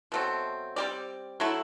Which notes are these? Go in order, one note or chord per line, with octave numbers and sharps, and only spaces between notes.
B2 F#3 A3 C4
G3 C4 G4 D5
F#3 A3 E4